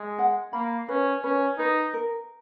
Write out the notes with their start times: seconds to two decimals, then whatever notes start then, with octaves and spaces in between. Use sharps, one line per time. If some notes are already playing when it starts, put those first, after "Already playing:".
Already playing: G#3
0.19 F#5
0.53 A#3 B5
0.89 C#4 B4
1.23 C#4 B4
1.58 D#4 B4
1.94 A#4